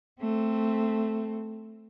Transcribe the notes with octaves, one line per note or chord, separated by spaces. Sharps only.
A3 C4